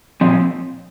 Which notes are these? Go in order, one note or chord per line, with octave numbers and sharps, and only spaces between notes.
A#2 F3 C4